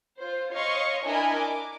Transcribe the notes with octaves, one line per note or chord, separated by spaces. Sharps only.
F4 C5
C#5 D#5 F5 C6 C#6
D4 E4 A#4 D#5 G#5 B5
D6